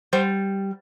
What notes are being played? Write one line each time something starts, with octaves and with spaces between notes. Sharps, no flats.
G3 C5